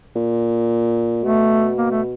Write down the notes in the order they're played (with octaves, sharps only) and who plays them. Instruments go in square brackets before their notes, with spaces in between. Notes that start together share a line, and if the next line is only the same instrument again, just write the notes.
[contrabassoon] A#2
[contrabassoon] B2 [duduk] A3
[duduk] A#3
A3